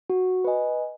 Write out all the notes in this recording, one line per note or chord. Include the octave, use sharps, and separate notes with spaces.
F#4
B4 D#5 G#5